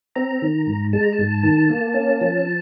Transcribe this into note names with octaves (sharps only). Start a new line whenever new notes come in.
C4 A#5
D#3
G#2
G#3 A5
A#5
A5
G#2
D#3
A#3
C#4
F3